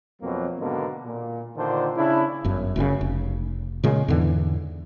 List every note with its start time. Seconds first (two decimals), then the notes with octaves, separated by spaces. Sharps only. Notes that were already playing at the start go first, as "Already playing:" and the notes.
0.22 F2 B2 F#3 A#3 C4
0.60 G#2 B2 D3 D#3 A#3
1.05 A#2
1.57 A#2 D3 D#3 D4 C5
1.96 C#3 D4 E4
2.44 G1 F#2
2.76 F#1 F#2 A#2 C#3
3.01 F1
3.84 A#2 C#3 G#3
4.08 E2 G#2 D3 E3